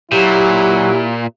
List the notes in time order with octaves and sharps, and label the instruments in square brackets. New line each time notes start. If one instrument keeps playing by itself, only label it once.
[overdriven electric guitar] A#2 [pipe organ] F#3 [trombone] E4 [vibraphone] G4